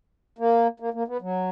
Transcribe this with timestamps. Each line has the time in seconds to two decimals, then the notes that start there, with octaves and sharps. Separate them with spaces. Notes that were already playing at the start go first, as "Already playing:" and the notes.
0.38 A#3
0.80 A#3
0.94 A#3
1.08 B3
1.21 F#3